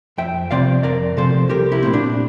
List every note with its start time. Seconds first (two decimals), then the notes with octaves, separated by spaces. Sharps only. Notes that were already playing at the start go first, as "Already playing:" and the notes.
0.18 F2 E5 G5
0.51 C3 F3 C4 D5 F5
0.83 F2 A#4 D5
1.17 C3 F3 C4 A4 C5
1.50 C2 G4 A#4
1.72 E4 G4
1.83 A#2 A3 C4
1.93 D4